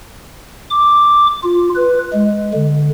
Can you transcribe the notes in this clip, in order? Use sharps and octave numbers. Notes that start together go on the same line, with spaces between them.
D6
F4
B4
G#3
D3